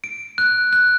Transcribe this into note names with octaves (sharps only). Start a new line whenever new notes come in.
D7
F#6
F#6